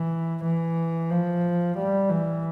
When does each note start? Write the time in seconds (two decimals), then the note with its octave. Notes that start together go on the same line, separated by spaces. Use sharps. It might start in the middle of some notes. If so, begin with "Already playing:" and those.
Already playing: E3
0.44 E3
1.10 F3
1.77 G3
2.10 E3